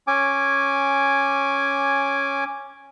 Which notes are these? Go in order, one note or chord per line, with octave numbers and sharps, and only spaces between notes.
C#4 G#5 D6